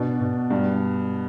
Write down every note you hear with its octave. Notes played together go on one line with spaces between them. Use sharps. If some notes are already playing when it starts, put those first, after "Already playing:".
Already playing: B2 D4
B2
G2